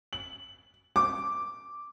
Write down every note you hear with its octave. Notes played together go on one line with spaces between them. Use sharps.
F#7
D6